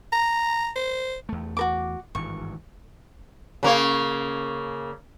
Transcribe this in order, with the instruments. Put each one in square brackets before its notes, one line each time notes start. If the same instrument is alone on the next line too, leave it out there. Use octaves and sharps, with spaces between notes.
[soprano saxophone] A#5
C5
[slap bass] E2 A3
[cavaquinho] F#4 A#4 D6
[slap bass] G#1 G2 E3 [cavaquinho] C#6
[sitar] C#3 A#3 C#5